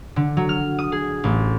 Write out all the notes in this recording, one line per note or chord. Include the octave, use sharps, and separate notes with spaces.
D3
F#3
F6
D#6
G#4
A1